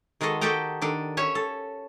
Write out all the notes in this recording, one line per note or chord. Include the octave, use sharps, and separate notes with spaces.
D#3 G#3 F#4 A4 D#5
F#4 G4 A4 D#5 G5 A#5
D#3 D4 A4
C#4 C#5 E5
A4